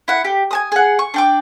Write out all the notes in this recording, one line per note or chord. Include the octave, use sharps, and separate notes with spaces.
E4 F#5
G4
G#5 A5 D#6
G#4 F#5
C#6
D4 G5 D6